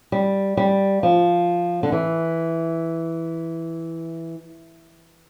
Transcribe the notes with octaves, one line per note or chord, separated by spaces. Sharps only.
G3
G3
F3
D3
E3